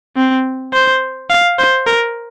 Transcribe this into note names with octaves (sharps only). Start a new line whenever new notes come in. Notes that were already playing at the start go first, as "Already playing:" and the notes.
C4
C5
F5
C5
A#4